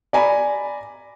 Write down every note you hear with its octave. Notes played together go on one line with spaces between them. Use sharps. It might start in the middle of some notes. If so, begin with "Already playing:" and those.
D5 G#5 A#5 B5